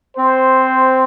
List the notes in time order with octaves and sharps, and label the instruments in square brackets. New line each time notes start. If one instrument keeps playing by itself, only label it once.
[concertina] C4 [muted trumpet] C5